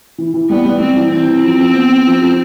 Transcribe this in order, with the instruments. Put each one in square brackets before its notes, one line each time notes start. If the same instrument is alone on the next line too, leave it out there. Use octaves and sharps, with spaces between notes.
[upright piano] E3
E3
[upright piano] G3 [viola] B3
[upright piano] G3
[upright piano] G3 [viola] C4
[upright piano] E3
[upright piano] E3 [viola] C4
[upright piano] E3
F3
F3
B3
F3
F3
F3